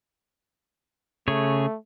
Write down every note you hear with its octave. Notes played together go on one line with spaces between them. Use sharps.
C#3 A3 G#4 C#5